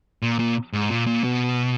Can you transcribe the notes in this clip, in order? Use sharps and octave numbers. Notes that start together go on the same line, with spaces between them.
A#2
A#2
G#2
A#2
A#2
B2